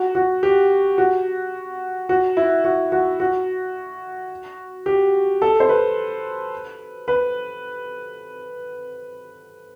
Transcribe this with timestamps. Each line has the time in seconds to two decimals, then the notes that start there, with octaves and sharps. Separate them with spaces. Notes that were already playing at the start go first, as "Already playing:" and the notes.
Already playing: F#4
0.15 F#4
0.43 G4
0.98 F#4
2.09 F#4
2.37 E4
2.64 F#4
2.92 F#4
3.20 F#4
4.86 G4
5.42 A4
5.60 C5
5.69 B4
7.08 B4